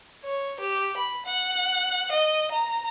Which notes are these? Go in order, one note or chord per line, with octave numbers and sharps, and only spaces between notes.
C#5
G4
B5
F#5
D#5
A#5